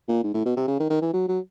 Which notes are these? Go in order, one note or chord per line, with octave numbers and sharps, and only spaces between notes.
A#2
G#2
A2
B2
C3
C#3
D#3
D#3
E3
F#3
F#3